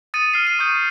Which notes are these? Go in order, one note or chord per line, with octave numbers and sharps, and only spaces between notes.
D#6 A6 C#7 D#7
F6 C7
D#7
C#6 D#6 G6 C#7